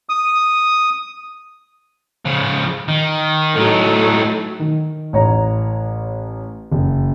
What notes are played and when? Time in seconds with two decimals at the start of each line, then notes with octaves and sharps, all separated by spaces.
0.09 D#6
2.25 C#3 F3
2.88 D#3
3.55 A2 F#3 A3 D#4
4.59 D#3
5.13 A1 C#5 A#5
6.72 F#1